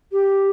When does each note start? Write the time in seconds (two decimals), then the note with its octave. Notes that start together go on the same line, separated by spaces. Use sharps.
0.12 G4